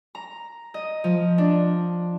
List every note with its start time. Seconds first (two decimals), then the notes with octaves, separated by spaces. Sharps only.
0.15 A#5
0.74 D#5
1.04 F3
1.38 D4